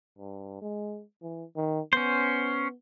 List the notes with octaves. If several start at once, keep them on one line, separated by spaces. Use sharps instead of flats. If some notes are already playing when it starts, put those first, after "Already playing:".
G2
G#3
E3
D#3
B3 C#4 C5